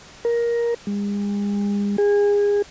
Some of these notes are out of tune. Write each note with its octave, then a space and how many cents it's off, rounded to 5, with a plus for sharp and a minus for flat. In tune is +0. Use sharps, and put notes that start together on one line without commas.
A#4 +15
G#3 -40
G#4 -25